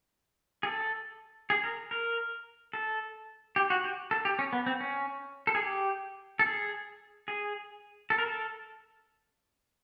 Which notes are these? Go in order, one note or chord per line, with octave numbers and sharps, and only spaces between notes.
G#4
A4
G#4
A#4
A#4
A4
G4
F#4
G4
A4
G4
C#4
B3
C4
C#4
A4
G#4
G4
A4
G#4
G#4
A4
A#4
A4